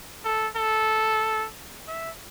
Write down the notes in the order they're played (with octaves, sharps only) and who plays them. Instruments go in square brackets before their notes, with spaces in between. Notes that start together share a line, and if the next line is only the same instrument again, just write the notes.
[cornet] A4
A4
E5